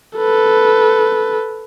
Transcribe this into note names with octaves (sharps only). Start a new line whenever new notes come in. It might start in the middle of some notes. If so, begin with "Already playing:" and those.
A4 B4